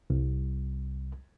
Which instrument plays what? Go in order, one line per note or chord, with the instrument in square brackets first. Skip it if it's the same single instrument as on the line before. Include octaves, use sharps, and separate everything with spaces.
[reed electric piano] C2